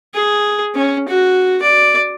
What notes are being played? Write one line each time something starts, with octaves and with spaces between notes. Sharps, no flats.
G#4
C#4
F#4
D5